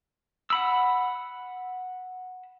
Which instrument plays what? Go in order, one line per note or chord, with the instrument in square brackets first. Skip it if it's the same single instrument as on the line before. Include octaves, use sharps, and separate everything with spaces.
[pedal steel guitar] F#5 B5 E6